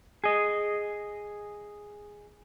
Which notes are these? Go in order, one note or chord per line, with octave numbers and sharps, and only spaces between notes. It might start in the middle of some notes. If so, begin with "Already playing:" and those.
G#4 D#5